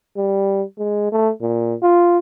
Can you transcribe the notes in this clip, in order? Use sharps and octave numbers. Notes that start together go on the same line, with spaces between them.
G3
G#3
A3
A#2
F4